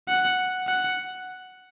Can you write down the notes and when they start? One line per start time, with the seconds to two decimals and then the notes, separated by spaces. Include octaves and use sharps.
0.08 F#5
0.68 F#5